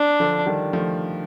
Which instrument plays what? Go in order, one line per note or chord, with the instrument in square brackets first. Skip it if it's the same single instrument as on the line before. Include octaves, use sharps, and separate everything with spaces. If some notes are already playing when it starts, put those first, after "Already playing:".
Already playing: [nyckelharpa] D4
[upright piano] D3 F3
D#3 G3
F3 A3